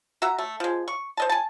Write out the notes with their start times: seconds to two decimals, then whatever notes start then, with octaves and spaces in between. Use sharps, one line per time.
0.22 F#4 E5 A#5
0.39 A3
0.60 F3 G#3
0.88 C#6
1.17 C5 D#5 A5
1.29 G#5 A5